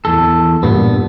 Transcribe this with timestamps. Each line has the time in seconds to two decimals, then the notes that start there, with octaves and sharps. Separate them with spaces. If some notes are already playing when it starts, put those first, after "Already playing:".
0.05 E2 A4
0.63 G2 A#2 B3